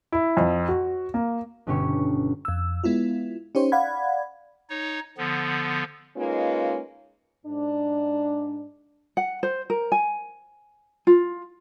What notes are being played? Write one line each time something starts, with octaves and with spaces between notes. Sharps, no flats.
E4
F2
F#4
A#3
G1 B2 D3 C#4 G4 C#6
F2 E6
G#3 B3 E4 F4
C#4 D#4 G4 C5 C#5
D5 F5 F#5 B5 G#6
D#4 C#5
D3 F3 B3
G#3 A#3 C#4 D#4 F4 B4
G#2 D4
F#5
C5
A#4
G#5
F4